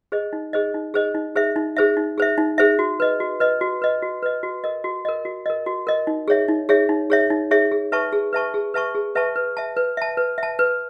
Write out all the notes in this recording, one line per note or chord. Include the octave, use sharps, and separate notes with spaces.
G#4 C5 D#5
D#4
G#4 C5 D#5
D#4
G#4 C5 D#5
D#4
G#4 C5 E5
D#4
G#4 C5 E5
D#4
G#4 C5 E5
D#4
G#4 C5 E5
F#4
B4 D#5
F#4
B4 D#5
F#4
B4 D#5
F#4
B4 D#5
F#4
A#4 D#5
F#4
A#4 D#5
F#4
A#4 D#5
F#4
A#4 D#5
D#4
G#4 C#5 E5
D#4
G#4 C#5 E5
D#4
G#4 C#5 E5
D#4
G#4 C#5 E5
G#4
B4 E5 A5 C#6
G#4
B4 E5 A5 C#6
G#4
B4 E5 A5 C#6
G#4
B4 E5 A5 C#6
B4
E5 A5
B4
E5 A5
B4
E5 A5
B4